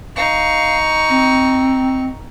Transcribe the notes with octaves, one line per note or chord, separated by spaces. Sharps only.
D#4 F5 C#6
C4